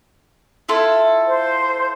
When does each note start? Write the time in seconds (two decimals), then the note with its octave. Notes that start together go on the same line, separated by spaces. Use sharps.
0.69 E4 F4 A4
1.27 C5